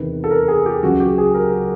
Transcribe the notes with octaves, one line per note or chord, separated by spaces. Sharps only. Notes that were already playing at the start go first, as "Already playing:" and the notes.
Already playing: E2 C3 D#3 B4
A4
A#4
G#4
G4
C#2 C#3 F#3 F#4
G4
G#4
A#4